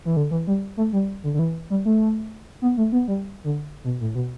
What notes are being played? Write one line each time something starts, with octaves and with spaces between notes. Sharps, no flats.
E3
D3
E3
G3
A3
G3
D3
D3
E3
G3
A3
B3
A3
B3
G3
D3
B2
A2
B2